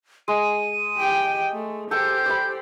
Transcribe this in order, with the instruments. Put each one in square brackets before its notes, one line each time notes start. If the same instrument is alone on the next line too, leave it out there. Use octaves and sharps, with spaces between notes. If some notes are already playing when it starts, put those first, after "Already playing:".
[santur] G#3 [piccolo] D#7
[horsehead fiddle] G4 G5
A3
[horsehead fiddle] G4 C5 [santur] A4 G5 [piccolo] G6
[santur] D5 B5